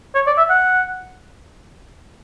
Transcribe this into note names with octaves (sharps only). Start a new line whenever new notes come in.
C#5
D5
E5
F#5